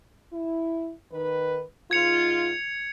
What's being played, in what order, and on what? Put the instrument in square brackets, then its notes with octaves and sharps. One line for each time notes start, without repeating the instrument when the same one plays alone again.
[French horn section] E4
D#3 B4
[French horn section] G#2 F4 [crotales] G#6 C#7 F7